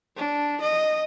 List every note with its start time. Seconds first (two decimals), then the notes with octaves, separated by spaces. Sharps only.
0.16 D4
0.61 D#5